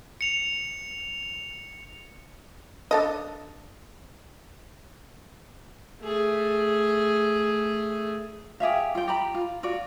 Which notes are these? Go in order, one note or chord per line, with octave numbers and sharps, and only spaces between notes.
C#7 F7
D4 A4 D#5
A3 G#4
G4 G#4 E5 F5
F4 G5
G4 A#5 B5
F4
F4 F#4 D5